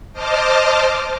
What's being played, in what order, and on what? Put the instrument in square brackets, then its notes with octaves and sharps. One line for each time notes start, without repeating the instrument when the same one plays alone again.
[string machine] C5 D#5 A5 D6 F6